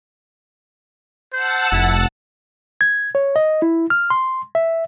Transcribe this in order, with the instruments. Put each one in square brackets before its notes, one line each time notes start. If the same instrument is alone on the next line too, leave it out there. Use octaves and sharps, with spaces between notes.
[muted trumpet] C5 [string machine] F#5 A5 E6
[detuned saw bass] F1 [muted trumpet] E4
[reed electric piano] G#6
C#5
D#5
E4
F6
C6
E5